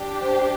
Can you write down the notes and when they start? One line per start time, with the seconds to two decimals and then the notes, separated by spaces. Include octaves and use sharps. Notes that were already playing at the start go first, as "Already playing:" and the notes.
Already playing: D4 G4
0.22 C5